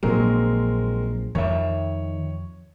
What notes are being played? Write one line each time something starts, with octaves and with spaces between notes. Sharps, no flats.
A#1 A#2 F#3 G#3 C4 A#4
F2 D#3 A#4 C#5 E5